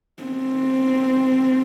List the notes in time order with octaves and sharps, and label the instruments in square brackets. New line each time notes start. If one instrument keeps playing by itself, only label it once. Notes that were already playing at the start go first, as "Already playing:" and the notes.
[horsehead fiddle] C4